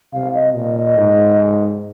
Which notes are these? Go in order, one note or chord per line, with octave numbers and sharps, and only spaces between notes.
C3 F5
D#5
A#2 D#5
D#5
G#2